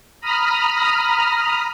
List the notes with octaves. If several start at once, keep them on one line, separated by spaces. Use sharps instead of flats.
A#5 B5 D#6 F6